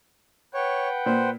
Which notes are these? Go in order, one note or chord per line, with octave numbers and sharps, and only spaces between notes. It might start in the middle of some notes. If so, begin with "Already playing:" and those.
B4 C#5 F#5 G5
A#2 C5